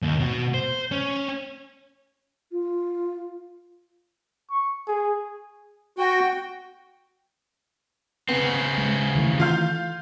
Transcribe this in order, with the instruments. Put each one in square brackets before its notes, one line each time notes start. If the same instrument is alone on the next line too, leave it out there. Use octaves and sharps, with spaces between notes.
[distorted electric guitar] D#2
B2 F#4
C5
C#4
[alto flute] F4
[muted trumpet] C#6
G#4
[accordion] F#4 [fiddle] G5
[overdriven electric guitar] C#3 C4 [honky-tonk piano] B3
[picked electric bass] G#3
D#3 E3 A3
[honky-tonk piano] F4 F5 G6